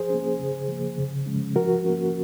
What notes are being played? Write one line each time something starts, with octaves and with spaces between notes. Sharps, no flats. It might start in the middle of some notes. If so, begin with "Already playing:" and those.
Already playing: F3 G#4 C5
A#3 C#4
C#3
F3 A#3
C#3
F3 G#3 C#4
F3 F#4 A#4
A#3 C#4